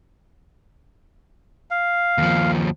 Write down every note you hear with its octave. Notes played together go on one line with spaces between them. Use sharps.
F5
D#2 F3